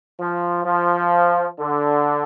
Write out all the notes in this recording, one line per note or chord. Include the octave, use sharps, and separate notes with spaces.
F3
F3
D3